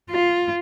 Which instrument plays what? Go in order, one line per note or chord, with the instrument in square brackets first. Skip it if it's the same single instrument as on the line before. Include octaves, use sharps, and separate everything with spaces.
[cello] F4